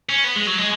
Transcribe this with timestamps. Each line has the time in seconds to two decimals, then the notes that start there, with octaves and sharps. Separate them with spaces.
0.09 C#4
0.24 B3
0.36 G#3
0.47 F#3
0.58 G#3